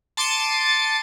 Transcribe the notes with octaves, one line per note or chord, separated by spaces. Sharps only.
A5 C6 D6 A6 C#7 D#7